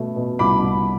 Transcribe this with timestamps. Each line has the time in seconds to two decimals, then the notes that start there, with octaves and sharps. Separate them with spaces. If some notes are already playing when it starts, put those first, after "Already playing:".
Already playing: B2 A3
0.16 B2
0.39 C2 B5 D6
0.63 C2